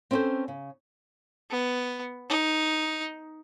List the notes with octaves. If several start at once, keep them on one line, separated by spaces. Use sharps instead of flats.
C4 C#4 E4 A4 B4 C5
C#3
B3
D#4